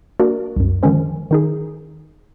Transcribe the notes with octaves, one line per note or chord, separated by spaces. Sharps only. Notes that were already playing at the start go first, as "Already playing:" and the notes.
A#3 D4 F#4 A#4 D5
C2 F#2
D3 D#3 F3 G#3 C#4 C5
D#3 D#4 G#4